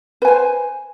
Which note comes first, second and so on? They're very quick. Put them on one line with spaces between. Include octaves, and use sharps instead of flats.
B4 G#5 C5